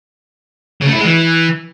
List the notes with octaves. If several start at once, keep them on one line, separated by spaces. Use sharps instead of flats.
C#3
A3
E4
G#3
E3